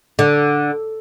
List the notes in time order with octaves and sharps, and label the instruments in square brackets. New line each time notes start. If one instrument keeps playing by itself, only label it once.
[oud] D3